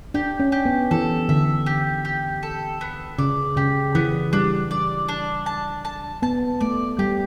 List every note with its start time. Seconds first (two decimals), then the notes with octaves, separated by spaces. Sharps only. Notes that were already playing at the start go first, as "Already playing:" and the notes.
0.14 D4 G4
0.40 C#4
0.52 G4
0.65 B3
0.91 E3 A4
1.29 D3 E5
1.66 G4
2.05 G4
2.43 A4
2.81 B3
3.18 C#3 D5
3.57 C#3 G4
3.95 E3 B3
4.33 G3 D4
4.71 D5
5.08 D4
5.46 A5
5.85 A5
6.22 B3 A5
6.61 A3 D5
6.99 G3 G4